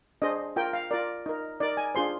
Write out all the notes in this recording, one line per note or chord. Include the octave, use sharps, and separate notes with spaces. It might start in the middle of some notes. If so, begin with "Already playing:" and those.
D4 G#4 C5 D#5
F4 A#4 G5
F5
F4 A#4 D5
D#4 A#4
D#4 A#4 D5
G#5
D4 F4 G#4 C5 C6